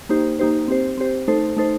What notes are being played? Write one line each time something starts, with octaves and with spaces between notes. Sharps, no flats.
A#3 D#4 G4 C5
A#3 D#4 G4 C5
C4 G4 C5
C4 G4 C5
A3 D#4 A4 C5
A3 D#4 A4 C5